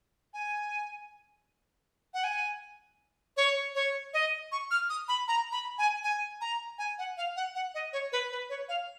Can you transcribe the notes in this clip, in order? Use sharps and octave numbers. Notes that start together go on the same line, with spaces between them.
G#5
F#5
G#5
C#5
C#5
D#5
C#6
F6
D#6
B5
A#5
B5
G#5
G#5
A#5
G#5
F#5
F5
F#5
F#5
D#5
C#5
B4
B4
C#5
F5